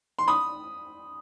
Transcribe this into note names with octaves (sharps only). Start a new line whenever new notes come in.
C6
B5 D#6